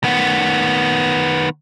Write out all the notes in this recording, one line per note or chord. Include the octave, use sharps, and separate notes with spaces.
D#3 B3